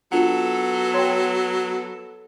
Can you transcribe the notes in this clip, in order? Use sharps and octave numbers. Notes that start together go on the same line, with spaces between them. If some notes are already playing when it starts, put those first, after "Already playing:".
F#3 B3 D4 F4 A4 B4 F#5
C#5 G5 C6